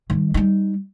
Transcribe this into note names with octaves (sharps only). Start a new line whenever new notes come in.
D#3 G3
G3 D#4